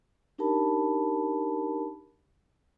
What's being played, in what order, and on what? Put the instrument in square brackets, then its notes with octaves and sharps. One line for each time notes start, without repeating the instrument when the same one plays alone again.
[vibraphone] D4 D#4 G4 A#4 A5 B5